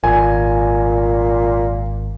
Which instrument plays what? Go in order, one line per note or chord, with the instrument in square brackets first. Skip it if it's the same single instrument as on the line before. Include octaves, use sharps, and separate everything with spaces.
[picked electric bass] G#1 [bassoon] A#2 [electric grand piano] G#5